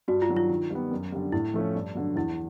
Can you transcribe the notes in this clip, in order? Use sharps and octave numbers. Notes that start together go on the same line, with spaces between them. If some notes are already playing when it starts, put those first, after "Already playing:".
G2 F#4
F4
D#3 F#3
F4
D#3
G3 B3
F#2
D3 G3
A2 E4
F3 A3 C#4
G2
D3 F#3
E2 E4